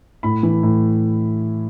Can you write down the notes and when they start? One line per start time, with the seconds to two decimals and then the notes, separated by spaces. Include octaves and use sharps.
0.23 A2 B5
0.43 E3
0.63 A2